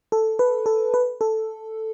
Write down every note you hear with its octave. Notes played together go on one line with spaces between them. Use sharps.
A4
B4
A4
B4
A4